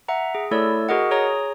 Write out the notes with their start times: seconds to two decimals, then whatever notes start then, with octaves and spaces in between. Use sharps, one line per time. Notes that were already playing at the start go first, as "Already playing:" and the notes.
0.08 E5 F#5 A#5
0.35 G#4
0.51 A3 E4 A4 C#5 D5 E6
0.89 F#4 G#4 A#4 D#5 F#5
1.11 G#4 C#5 A#5 D#6